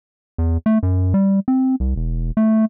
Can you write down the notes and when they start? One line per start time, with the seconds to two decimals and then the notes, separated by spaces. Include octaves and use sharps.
0.38 E2
0.66 A3
0.83 F#2
1.14 G3
1.48 C4
1.80 C2
1.96 E1
2.37 A3